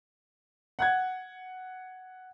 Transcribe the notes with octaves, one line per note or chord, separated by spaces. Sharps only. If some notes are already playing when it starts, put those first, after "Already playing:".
F#5 F#6 G#6